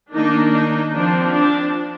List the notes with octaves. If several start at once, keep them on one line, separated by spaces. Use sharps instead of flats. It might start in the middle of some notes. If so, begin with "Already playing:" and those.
D#3 A#3 D4 D#4
D#4
F3 C4 D4
D4